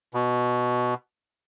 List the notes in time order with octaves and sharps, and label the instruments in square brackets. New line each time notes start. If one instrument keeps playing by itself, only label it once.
[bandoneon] B2